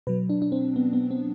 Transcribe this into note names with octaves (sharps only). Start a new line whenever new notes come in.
B2 F#3 B4
D4
D4
C4
B3
B3
C4